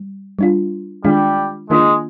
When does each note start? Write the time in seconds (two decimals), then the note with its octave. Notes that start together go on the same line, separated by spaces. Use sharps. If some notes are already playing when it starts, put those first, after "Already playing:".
Already playing: G3
0.39 G3 D4 F4
1.04 D#3 G3 G#3 D4 F4
1.70 D#3 G#3 A#3 D4 F4